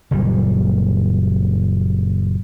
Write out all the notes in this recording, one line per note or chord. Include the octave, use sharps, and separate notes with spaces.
F#1 A#2 G3